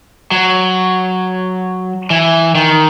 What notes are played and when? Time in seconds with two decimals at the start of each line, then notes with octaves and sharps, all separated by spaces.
0.31 F#3
2.10 E3
2.55 D#3